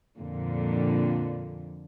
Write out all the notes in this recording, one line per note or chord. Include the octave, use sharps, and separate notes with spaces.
F2 A#2 D3